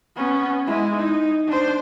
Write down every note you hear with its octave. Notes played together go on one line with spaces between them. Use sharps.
B3 C#4
G#3 E4
D#4
D4 C5